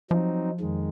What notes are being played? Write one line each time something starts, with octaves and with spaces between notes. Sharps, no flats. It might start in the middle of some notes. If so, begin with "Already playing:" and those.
F3 F#3 C4 D#4
F2 D#3 G#3